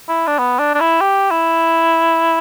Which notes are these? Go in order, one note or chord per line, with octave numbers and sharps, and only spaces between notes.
E4
D4
B3
D4
D4
E4
G4
E4